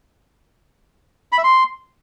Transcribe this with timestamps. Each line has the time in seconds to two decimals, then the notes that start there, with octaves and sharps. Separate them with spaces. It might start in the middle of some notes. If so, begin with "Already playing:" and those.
1.32 B5
1.38 E5
1.44 C6